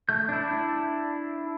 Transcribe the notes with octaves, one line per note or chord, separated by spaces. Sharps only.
A3 G6
D4 E4